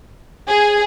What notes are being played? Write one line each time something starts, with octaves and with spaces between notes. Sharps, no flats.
G#4